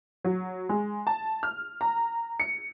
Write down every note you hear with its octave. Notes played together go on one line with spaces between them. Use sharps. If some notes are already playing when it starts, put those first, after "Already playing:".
F#3
G#3
A5
F6
A#5
C#7